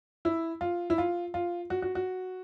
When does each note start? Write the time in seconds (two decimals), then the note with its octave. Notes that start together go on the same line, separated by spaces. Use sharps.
0.25 E4
0.61 F4
0.90 E4
0.98 F4
1.34 F4
1.70 F#4
1.82 F#4
1.95 F#4